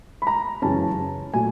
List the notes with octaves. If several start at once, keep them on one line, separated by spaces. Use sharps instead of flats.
B5
A#5
F#2 C#3 E3 G#3 C#4 A5
A#2 F#3 A3 G#5